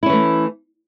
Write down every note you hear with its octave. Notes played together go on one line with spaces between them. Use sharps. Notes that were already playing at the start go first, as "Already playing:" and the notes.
E3 A3 C#4 E4